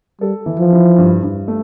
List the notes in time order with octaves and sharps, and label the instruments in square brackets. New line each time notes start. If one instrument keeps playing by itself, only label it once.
[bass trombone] G3 [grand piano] A4
[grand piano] E3
[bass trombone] F3
[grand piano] E4
G2
G2
A3